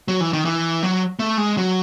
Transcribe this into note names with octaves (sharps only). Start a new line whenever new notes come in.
F#3
E3
D#3
E3
F#3
A3
G#3
F#3